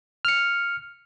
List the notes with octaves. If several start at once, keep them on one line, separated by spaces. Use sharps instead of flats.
F6 C#7